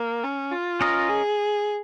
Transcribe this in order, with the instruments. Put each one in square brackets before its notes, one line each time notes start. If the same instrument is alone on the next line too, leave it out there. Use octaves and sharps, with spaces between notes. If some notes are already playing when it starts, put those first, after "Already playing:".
Already playing: [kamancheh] A#3
C#4
F4
[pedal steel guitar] C#4 A#4 D#5
[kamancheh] G#4